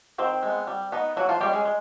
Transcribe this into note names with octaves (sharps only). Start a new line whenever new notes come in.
D#3 C4 C5
G#3 B3
G3
B3 D#4
E3 F#3 F#4
F3 F4
G3 G#3 C#4 G4
G#3 G#4
G#3